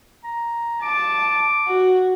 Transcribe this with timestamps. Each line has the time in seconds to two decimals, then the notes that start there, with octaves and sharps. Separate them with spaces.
0.24 A#5
0.82 A5 D6
1.67 F#4